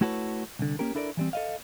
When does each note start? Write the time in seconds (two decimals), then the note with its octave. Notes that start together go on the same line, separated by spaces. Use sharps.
0.01 A3 E4 F#4 A4 B4 C#5
0.59 C2 D3
0.79 A#3 C#4 G4 A#4
0.95 D4 E4 A4 A#4 C5 D5
1.17 E3 G3 C4
1.33 A4 D#5 F5